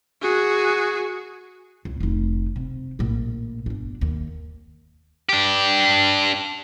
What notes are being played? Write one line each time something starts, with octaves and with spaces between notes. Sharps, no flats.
F#4 G#4
C#2
F1 D#4
C3
A#1 A2
G1 D4
D#2
D4 G4